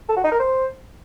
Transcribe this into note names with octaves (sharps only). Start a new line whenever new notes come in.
A4
F#4
D#4
A#4
C5